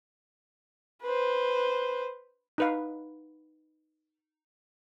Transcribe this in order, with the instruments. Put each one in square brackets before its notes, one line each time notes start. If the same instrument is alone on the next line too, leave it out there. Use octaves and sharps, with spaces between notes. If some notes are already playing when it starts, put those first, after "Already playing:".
[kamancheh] B4 C5
[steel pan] D#4 B4 F5